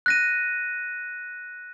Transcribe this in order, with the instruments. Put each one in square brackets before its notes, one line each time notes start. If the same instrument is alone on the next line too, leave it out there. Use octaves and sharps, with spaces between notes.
[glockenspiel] F#6 A#6 D#7